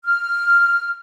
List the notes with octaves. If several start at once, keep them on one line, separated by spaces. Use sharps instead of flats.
F6